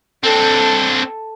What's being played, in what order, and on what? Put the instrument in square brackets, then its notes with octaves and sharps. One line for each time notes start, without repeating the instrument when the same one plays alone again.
[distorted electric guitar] C4 D4 [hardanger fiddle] A4